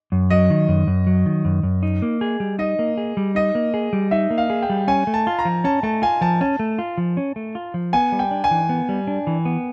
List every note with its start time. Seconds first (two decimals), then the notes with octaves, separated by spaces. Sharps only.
0.12 F#2
0.30 F#3 D#5
0.50 D#3
0.68 F#2
0.87 F#2
1.07 F#3
1.26 D#3
1.45 F#2
1.63 F#2
1.83 D#4
2.02 A#3
2.21 G#4
2.40 G3
2.59 D#4 D#5
2.79 A#3
2.98 G#4
3.17 G3
3.35 D#4 D#5
3.55 A#3
3.74 G#4
3.93 G3
4.11 D#4 E5
4.30 A#3
4.38 F5
4.50 G#4
4.63 G5
4.70 G3
4.88 C#4 G#5
5.07 A3
5.14 A5
5.27 F4
5.39 A#5
5.45 F3
5.64 C#4 A5
5.83 A3 A5
6.02 F4 G#5
6.21 F3 A5
6.41 C#4 A5
6.59 A3
6.79 F4
6.98 F3
7.17 C#4
7.36 A3
7.55 F4
7.74 F3
7.93 B3 G#5
8.12 G3
8.19 G5
8.31 D4
8.44 G#5
8.51 E3
8.69 B3
8.89 G3
9.07 D4
9.27 E3
9.45 B3